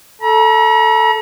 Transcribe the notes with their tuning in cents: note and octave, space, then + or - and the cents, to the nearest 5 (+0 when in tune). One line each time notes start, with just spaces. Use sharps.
A4 +0 A#5 +45